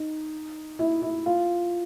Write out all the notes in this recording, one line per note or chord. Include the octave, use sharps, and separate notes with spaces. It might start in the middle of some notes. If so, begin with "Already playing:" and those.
Already playing: D#4
E4
E4
F4